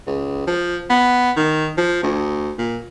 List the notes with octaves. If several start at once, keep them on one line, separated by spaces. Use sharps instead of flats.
C#2
F3
B3
D#3
F3
D2
A#2